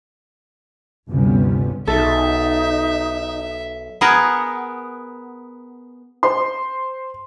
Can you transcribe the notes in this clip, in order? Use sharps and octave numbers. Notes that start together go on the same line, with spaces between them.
G1 D2 C3 G3 B3 C#4
B1 D#4 A4 E5
B3 G#4 A#4 F#5
C5 C6